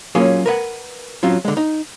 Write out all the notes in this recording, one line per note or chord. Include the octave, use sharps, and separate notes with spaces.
F#3 A#3 C#4 F4 G#4 C#5
A#4 B4 F#5
F#3 C4 C#4 F4
D3 G#3
D#4